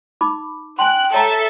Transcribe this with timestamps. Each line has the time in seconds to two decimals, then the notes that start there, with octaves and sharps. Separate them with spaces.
0.21 D#4 B5 D6
0.79 G5 G#5 C6 F#6
1.14 A4 C#5 E5 A5 A#5